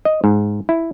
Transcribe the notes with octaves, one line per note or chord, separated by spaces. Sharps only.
D#5
G#2
E4